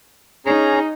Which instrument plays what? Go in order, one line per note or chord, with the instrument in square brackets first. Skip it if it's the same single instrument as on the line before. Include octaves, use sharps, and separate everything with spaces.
[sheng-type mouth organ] C#4 G#4 A#5 [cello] D#4